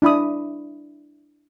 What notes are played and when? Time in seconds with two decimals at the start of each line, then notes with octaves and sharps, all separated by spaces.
0.02 D4 E4 B5 D#6